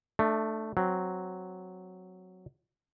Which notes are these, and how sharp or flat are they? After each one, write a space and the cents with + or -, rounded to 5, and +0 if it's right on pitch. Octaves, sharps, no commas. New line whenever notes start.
A3 +0 D4 +30
F#3 +0 C4 +0